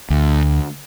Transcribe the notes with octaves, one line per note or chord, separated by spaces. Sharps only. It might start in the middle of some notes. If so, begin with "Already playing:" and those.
D2